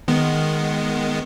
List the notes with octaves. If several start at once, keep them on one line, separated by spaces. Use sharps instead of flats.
D#3 G#3 B3